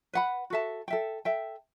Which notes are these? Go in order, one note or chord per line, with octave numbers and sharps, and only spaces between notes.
B4 F#5 B5
F#4 A4 E5 A5
A4 E5 G5
A4 E5 G5